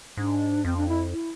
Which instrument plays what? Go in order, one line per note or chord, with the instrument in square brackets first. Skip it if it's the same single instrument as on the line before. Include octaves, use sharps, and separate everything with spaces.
[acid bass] G#2 [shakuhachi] D4
[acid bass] F2 [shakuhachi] C4
[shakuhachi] D4
E4
E4